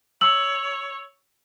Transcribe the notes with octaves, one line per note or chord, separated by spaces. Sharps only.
C#5 E6 F#7